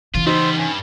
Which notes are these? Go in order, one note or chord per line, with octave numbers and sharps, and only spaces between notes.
C#3 E3 F4
G3 B3 D#4 C5 C6 E6
G2 C#4